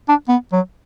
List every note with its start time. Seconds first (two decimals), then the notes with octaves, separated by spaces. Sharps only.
0.09 D4
0.28 B3
0.53 F#3